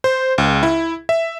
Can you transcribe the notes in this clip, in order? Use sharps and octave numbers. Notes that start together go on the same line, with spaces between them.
C5
C#2
E4
E5